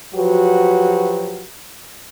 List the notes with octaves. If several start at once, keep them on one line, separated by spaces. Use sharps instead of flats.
F3 F#3 F#4 G4 B4